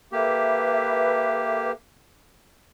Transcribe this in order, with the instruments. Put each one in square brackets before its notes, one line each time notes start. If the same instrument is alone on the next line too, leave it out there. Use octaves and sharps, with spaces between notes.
[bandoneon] A#3 G4 [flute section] A4 B4 E5